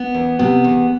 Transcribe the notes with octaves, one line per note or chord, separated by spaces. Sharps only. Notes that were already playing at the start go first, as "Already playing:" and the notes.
Already playing: B3
E2
C3 B3
E2